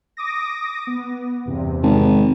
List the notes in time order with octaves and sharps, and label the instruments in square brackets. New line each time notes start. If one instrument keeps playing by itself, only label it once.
[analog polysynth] D6 D#6 A#6
B3
E2 G2 C3
[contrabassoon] G#1